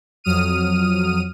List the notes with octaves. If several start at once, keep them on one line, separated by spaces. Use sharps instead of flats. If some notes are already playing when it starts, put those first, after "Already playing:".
F2 F#3 D#6 F6 D#7